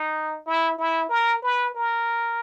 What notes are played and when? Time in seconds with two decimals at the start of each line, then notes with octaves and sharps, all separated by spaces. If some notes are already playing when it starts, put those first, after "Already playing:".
Already playing: D#4
0.46 E4
0.78 E4
1.09 A#4
1.42 B4
1.75 A#4